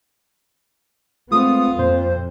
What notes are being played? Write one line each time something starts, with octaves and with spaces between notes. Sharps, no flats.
G#3 A3 B3 C4 F4 D#6
F2 A#2 C5